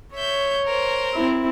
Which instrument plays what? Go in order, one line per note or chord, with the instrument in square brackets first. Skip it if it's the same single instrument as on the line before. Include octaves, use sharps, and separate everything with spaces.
[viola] C#5 [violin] E5 G6
[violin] A#4 C5
[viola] C4 E4